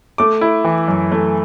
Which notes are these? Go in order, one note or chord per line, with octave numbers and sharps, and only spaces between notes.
A3 D6
E4
E3
F#2
A3